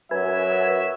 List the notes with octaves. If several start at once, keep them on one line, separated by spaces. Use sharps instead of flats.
F#2 F#3 B4 E5 G#5